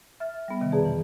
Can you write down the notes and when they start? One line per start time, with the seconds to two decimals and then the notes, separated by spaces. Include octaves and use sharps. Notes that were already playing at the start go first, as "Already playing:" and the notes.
0.20 E5 F6 A6
0.48 G3 B3
0.60 C3 D#3
0.72 F2 B2 G#4 D5 A5 A#5
0.85 E3